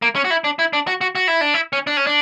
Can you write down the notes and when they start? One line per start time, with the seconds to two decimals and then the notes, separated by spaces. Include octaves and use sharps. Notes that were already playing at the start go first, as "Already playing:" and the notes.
0.02 A#3
0.16 C#4
0.24 F#4
0.31 E4
0.44 D4
0.59 E4
0.73 D4
0.87 F#4
1.01 F#4
1.15 F#4
1.28 E4
1.41 D4
1.54 E4
1.73 C#4
1.87 D4
1.97 C#4
2.07 D4